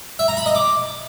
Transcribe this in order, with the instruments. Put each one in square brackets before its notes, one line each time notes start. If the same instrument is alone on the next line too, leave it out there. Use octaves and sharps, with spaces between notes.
[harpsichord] E5
A#5
B5
D#5
D6